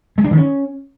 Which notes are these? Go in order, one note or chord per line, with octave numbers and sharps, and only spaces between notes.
G#3
D4
D#3
C#4